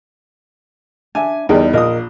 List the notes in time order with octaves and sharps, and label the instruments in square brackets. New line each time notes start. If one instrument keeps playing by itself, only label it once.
[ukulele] D4 E5 [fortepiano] G#5
[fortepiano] E2 G3 D#4 [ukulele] G#4 A#4 G5
[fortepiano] A#1 D#6 [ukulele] A#4 D#5